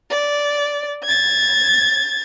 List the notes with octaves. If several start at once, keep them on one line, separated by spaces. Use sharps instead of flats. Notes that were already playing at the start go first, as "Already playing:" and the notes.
D5
G#6 A6